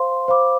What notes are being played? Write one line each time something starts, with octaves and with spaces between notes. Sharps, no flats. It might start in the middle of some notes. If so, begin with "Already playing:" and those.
Already playing: C5 F5 C6
C5 F5 B5 D6